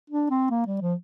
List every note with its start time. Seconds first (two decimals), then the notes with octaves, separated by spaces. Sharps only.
0.10 D4
0.30 C4
0.50 A#3
0.66 G3
0.81 F3